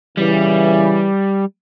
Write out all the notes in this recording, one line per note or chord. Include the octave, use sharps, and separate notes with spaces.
A#2 C#3 E3 G3